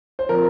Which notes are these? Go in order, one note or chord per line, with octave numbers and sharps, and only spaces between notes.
C5
F3 C4 F4 A#4